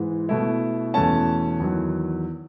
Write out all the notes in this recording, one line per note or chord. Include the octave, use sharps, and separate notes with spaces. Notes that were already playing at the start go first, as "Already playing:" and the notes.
Already playing: G#2 E3 G#3
B2 A3 E4
E2 B2 A3 C#4 A5
E2 D#3 F#3